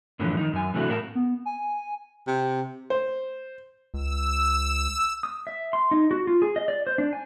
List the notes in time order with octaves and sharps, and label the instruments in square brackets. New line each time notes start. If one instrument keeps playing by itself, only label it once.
[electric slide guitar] F#2 A2 D3 E3 F3 C#4
D#3 D#4
F#2 G#5
C3 E3 A3 D4 E4 F#4
A2 A#4 G5 A5
[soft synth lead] B3
G#5
[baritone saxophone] C3
[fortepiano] C5
[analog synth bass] C#2 [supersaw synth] E6
[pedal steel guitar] D#6
E5
C6
D#4
F#4
F4
G#4
D#5
D5
C5
D4
G#5